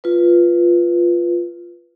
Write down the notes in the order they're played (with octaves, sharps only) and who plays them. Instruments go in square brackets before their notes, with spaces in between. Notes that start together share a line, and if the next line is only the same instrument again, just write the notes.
[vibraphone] F4 B4